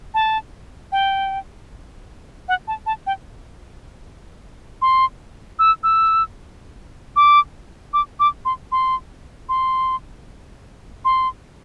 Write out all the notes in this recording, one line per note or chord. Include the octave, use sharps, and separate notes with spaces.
A5
G5
F#5
A5
A5
G5
C6
E6
E6
D6
D6
D6
C6
C6
C6
C6